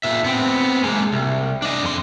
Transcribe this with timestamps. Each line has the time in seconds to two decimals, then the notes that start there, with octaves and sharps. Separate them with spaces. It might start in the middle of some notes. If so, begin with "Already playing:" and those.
0.03 A#2 E5
0.24 B3 C4
0.83 G#3 A#3
1.12 C2
1.62 D4 D#5
1.82 F2 C6